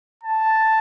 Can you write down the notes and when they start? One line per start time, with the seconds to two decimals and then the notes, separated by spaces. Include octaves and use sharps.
0.23 A5